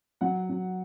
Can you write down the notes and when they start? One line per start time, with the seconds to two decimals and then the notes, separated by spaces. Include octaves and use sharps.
0.21 F#3 F#5
0.50 F#3